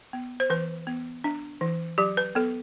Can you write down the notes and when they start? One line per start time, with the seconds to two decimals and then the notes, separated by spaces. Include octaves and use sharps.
0.13 B3
0.40 C5
0.50 E3 B4
0.87 B3
1.24 D4
1.61 E3
1.98 F#3 G4
2.17 B4
2.35 B3 A4